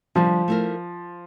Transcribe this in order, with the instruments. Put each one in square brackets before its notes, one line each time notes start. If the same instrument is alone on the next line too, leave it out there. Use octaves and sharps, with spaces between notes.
[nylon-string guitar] D3 G3 D4 [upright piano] F3
[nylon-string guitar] A3 E4 A#4